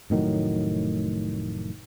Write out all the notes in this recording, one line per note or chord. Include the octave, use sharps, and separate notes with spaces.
F1 A2 D#3 F#3